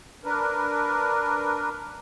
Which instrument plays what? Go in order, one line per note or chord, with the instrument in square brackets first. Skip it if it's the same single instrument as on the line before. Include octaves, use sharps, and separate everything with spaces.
[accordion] D4 A#4 B4